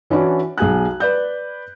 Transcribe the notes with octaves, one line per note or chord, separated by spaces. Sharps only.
E3 C#4 D4 E4 F#4 D5
B1 G#4 G#5 F#6
B4 D5 G6